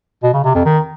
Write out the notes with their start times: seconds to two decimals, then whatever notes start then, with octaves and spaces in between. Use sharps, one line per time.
0.23 B2
0.34 C#3
0.44 C3
0.55 F2
0.65 D#3